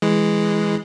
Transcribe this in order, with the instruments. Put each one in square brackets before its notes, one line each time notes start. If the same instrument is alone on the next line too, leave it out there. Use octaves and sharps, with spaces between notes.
[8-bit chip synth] E3 G#3